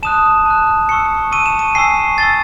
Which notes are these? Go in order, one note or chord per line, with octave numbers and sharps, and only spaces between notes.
A5 D#6 F#6 E7
A5 D#6 F#6
A5 C#6 E6 C#7
A5 C#6 E6 D#7
E7
D#7
G#5 C#6 E6 C7
G#5 C#6 E6 A6